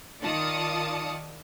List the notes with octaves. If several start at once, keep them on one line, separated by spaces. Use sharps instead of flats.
D#3 F4 D5 A5 D#6 C#7